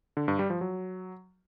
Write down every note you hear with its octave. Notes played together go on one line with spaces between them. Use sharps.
D3
G2
G3
F3
F#3